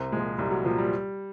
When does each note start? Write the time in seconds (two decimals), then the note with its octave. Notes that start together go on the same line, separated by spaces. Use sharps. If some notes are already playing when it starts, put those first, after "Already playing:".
Already playing: C2 C4
0.12 A#2 F3 G#3
0.38 C2 G3
0.51 F#3
0.65 A#2 F3
0.78 G3